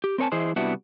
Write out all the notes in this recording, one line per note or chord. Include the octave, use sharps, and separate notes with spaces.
G4
C4 A#4 C#5 G#5 A5
E3 E4 G#4 C5 D#5
C3 G3 B3 D4 E4 F#4